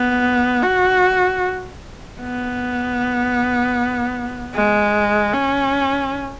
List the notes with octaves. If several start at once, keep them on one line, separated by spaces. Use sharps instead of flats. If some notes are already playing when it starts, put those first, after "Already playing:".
Already playing: B3
F#4
B3
G#3
C#4